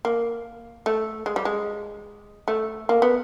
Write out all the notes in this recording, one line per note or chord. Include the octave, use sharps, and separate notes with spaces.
A#3
A3
G#3
G3
G#3
A3
A#3
B3